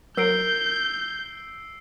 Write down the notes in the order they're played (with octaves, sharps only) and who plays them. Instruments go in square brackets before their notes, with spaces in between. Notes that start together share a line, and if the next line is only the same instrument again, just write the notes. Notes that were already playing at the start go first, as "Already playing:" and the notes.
[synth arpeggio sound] F#3 A#4 [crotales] E6 C7 D7 [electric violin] G6